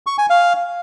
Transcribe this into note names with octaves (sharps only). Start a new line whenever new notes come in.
C#6
G#5
F5